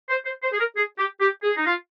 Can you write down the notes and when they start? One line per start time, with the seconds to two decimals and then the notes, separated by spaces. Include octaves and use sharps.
0.09 C5
0.25 C5
0.43 C5
0.51 G#4
0.59 A#4
0.76 G#4
0.98 G4
1.20 G4
1.43 G#4
1.57 D#4
1.66 F4